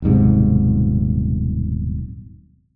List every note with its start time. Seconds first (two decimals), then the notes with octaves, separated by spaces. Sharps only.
0.02 D#1 B1 G#2 C3